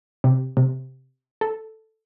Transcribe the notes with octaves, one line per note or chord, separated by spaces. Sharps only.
C3
C3
A4